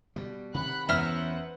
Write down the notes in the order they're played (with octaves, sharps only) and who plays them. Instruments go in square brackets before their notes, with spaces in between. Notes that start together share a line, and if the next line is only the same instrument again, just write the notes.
[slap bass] B2 G3
[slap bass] C3 D#3 [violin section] F#5 B5 F#6
[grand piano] E2 [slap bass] C#4 [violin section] B4 C5 F#5 [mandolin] E5 A#5 F6